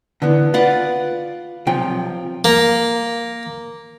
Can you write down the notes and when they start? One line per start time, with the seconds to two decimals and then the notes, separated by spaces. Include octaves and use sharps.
0.22 D3 E3 B3
0.54 F4 B4 D5 F#5
1.67 B1 C3 F3 G5
2.45 A#3